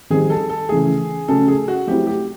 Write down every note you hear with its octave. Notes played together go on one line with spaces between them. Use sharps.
D#3 G3 C4 D#4 G#4
A4
A4
C#3 E3 A3 G#4
C#3 F#3 A3 C#4 A4
G#4
F#4
F#3 A3 C4 E4 G4
G4